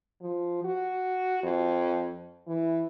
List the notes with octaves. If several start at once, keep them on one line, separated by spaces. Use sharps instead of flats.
F3
F#4
F2
E3